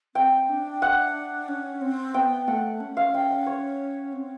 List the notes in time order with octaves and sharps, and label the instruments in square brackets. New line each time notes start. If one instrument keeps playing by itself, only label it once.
[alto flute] C4 [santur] G5
[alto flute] D4
[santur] F#5
[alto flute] C#4
C4
[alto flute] B3 [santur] G5
[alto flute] A3 [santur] F#5
[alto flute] C#4
[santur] F5
G5
F#5
C#5
[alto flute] C4